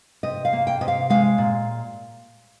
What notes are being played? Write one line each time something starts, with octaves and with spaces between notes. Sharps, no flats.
C3 D#5
F5
A#3
G5
C3 D#5
F5
G#3 F5
A#2